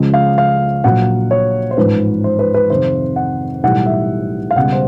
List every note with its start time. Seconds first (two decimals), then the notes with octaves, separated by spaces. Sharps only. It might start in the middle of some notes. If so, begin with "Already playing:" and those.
Already playing: C#2 C#3 F3 G#3
0.14 F5
0.38 F5
0.84 A#1 A#2 F#3 F#5
1.31 C#5
1.71 C5
1.77 A1 G#2 F3 G#3 B4
2.24 C5
2.39 B4
2.54 B4
2.70 F2 C3 D#3 C5
3.16 F#5
3.63 B1 A2 E3 G3 F#5
3.86 E5
4.51 F5
4.56 C#2 B2 G3 F#5
4.72 C5